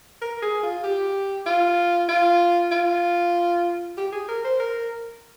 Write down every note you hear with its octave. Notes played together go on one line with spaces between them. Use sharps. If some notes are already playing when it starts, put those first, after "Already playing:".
A#4
G#4
F4
G4
F4
F4
F4
G4
G#4
A#4
C5
A#4